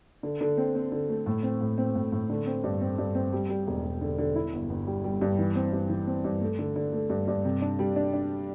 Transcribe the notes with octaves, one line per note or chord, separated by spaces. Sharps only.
D3
D3
C4
C4
D3
A3
A2
C4
A2
C4
A2
A2
D3
C4
G2
C4
G2
C4
G3
G3
E1
E1
D3
D3
E4
G1
G1
G3
G3
G2
E3
C4
G2
E3
C4
G2
A3
D3
D3
A3
G2
G2
C3
D4
G3
D4
D4